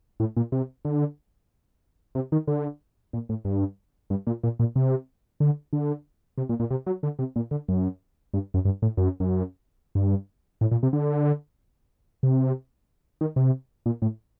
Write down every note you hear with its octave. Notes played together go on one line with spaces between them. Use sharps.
A2
A#2
C3
D3
C3
D#3
D3
A#2
A2
G2
G2
A#2
A#2
A#2
C3
D3
D3
C3
A#2
A#2
C3
F#3
D3
C3
A#2
D3
F#2
G2
F#2
G2
A2
F#2
F#2
G2
A2
A#2
C3
D3
C3
D#3
C3
A#2
A2